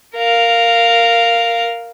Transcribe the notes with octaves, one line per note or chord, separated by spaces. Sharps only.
A#4 F5